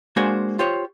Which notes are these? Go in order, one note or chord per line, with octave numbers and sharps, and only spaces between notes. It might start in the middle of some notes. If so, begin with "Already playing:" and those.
G#3 A#3 D4 F#4 C5 G#5
F4 G4 C5 C#5